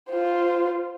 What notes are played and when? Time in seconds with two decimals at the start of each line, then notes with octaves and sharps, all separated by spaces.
0.10 F4 C5